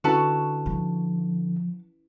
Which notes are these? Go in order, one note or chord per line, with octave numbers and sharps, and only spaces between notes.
D3 C#4 E4 F#4 B4 A5
F3